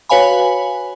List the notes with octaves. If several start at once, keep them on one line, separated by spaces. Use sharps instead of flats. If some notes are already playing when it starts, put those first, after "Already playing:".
F#4 B4 C#5 F5 G#5 B5